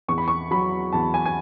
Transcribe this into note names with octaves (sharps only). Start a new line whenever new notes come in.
E2 C#6
B5
C#6
F#3 B5
E2 A5
G#5
G#5